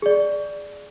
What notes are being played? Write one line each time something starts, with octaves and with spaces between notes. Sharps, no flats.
G#4 D5